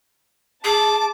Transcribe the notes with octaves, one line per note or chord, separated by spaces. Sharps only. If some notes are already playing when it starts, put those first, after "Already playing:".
G#4 A5 D6